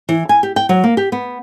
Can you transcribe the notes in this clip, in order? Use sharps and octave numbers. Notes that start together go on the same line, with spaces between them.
E3
G#5
G4
G5
F#3
A#3
G4
B3